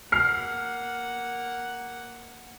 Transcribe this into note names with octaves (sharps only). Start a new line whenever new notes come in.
A#3 F#5 F6 C7